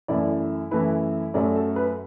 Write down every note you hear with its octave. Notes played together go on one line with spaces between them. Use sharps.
F#2 E3 A3 E4 D5
F#2 E3 A3 E4 B4
F#2 F#3 A3 D5
A4
B4